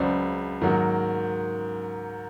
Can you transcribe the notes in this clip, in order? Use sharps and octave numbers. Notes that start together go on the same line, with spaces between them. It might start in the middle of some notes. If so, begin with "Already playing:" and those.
Already playing: C#2 C#3 F#3 C5 D5
G#2 D#3 F#3 A#3